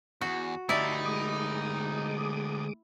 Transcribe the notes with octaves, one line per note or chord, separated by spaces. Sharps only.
E2 F#4
D2 D#4 E4 G4 D5 A5 C6 C#6
G#3 D6 D#6